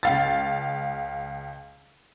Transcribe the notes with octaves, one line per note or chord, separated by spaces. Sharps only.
C#2 F5 A6